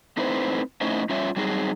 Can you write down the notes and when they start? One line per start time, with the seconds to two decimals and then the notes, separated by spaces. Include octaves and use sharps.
0.17 A3 C4 D#4 E4 B4 C5
0.81 A3 C#4 D#4 E4 C5 D#5
1.09 G3 C#4 F4 C#5 E5
1.36 F#3 G3 C4 D#4 F#4 G#4